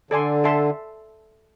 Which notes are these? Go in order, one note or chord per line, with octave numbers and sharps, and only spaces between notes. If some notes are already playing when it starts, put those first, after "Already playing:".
D3 A4 D5 G#5 C6
A4 E5 A5 C6